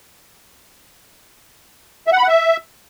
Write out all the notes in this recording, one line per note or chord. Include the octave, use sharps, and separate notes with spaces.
E5
F#5
B5
F#5
E5